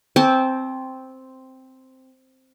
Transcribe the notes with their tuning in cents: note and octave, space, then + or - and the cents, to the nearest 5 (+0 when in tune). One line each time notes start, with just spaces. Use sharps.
C4 +0 A5 -30 C#6 +25